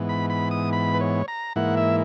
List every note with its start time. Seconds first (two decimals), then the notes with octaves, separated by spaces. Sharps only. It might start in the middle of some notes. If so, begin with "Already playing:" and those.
Already playing: G#2 E3 B3
0.09 B5
0.30 B5
0.51 D#6
0.73 B5
0.94 B4
1.01 C#5
1.28 A#5
1.56 G#2 E3 A#3 E4 F#5
1.77 E5